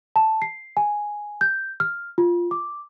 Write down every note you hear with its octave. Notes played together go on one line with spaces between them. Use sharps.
A5
C7
G#5
G6
F6
F4
D6